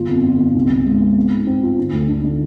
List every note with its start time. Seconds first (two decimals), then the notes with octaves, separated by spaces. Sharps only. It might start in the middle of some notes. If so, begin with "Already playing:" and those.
Already playing: G1 F4
0.09 F2
0.25 G1
0.40 G1
0.55 C2
0.70 C2
0.86 G#3
1.01 B3
1.16 C4
1.31 G#2
1.47 C4
1.63 F4
1.78 D3
1.93 D2
2.09 D3
2.24 D3